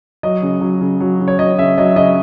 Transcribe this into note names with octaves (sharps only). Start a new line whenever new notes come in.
F#3 D#5
C#3
F#3
C#3
F#3
C#3
C#5
F#3 D#5
C#3 E5
F#3 D#5
C#3 D#5